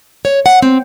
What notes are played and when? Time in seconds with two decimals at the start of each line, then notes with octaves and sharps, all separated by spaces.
0.25 C#5
0.46 F#5
0.62 C4